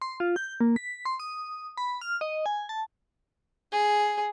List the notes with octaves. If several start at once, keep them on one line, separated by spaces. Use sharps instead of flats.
C6
F4
G6
A#3
B6
C6
D#6
B5
F6
D#5
G#5
A5
G#4